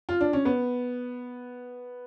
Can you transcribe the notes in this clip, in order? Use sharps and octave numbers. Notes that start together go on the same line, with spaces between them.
F4
D4
C#4
B3